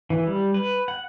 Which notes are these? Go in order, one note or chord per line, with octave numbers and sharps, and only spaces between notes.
E3
G3
B4
F#5